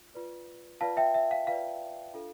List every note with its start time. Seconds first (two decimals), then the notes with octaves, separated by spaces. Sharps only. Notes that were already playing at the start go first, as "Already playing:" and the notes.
Already playing: F4
0.14 F4 B4 D5
0.81 F4 B4 D5 F5 A5
0.97 E5 G5
1.14 E5
1.31 F5
1.47 F4 B4 D5 F5
2.13 D4 F4 A4